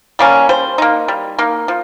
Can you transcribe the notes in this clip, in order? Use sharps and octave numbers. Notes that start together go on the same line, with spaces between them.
G3 A#3 C#4
G3 C5
A#3 D#4
G3
A#3 D#4
F3